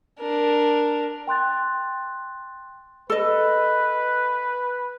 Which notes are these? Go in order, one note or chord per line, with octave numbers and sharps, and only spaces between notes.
D4 A#4
G5 C6 F#6 A6
A4 B4 D#5